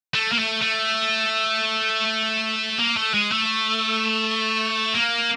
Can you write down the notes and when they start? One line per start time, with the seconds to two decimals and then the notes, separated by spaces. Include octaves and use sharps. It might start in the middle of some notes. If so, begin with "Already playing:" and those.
0.15 A3
0.33 A#3
0.39 A3
0.62 A3
2.79 A#3
2.97 A3
3.14 G#3
3.32 A3
4.94 A#3